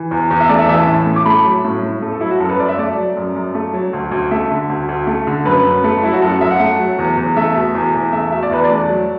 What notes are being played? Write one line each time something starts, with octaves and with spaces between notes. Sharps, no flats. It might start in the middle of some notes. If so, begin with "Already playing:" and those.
Already playing: E3
E2
E2
E5
A3 D5
E5
E3 E5
A5
A2
A2
D6
A3 B5
F#3
A2
A2
A3
A4
F#3 E4
F#4
F#2 A4
B4
F#2 D5
E5
A3 D5
F#3
F#2
F#2
A3
F#3
D2
D2
A3 E5
D3
D2
D2
A3
D3
F#2 B4
F#2
A3
F#3 E4
F#4
F#2 A4
F#4
F#2 E5
F#5
A3
F#3
E2
E2
A3 E5
B2
E2
E2
A3 E5
B2 E5
D5
E2 B4
D5
A3
F#3